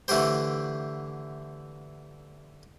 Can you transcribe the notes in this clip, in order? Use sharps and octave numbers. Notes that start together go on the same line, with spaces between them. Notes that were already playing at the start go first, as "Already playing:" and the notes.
D3 E3 A3 F#4 G4 C5